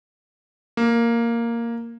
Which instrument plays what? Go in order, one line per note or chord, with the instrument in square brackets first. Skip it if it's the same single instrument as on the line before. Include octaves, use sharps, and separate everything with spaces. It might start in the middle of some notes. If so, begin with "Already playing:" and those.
[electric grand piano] A#3